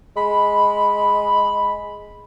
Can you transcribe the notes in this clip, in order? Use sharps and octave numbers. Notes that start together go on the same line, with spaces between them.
G#3 B5